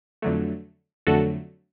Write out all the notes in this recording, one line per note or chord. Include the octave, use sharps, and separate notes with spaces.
F2 D3 F#3 A3
F2 D3 F#3 A3 F#4 A4